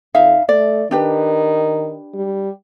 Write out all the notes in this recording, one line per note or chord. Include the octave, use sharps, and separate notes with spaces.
F2 D#4 E5 F5
A3 D5
D#3 D4 G4 B4
G3